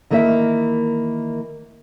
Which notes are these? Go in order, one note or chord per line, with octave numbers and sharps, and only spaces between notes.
D#3 E3 A#3 A#4 D#5 E5